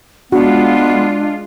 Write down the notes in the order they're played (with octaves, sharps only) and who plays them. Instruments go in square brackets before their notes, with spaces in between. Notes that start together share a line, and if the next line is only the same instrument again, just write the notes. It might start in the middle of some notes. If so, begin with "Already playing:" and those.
[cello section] G#3 F4 [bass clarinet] B3 [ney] D4 [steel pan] F#4